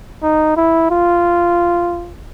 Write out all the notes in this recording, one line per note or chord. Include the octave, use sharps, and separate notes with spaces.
D#4
E4
F4